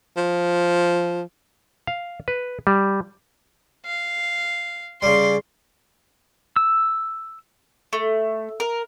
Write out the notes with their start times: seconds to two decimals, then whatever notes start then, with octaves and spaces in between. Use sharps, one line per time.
0.17 F3
1.87 F5
2.28 B4
2.67 G3
3.86 F5
5.02 C#3 G3 C6
6.56 E6
7.93 A3
8.60 A#4